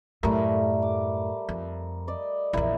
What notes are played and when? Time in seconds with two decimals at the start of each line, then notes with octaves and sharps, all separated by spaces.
0.23 F#2 A2 G3 A3 A#4
0.82 D6
1.49 F2
2.07 D5 D#5
2.53 A#1 E2 E4 A#4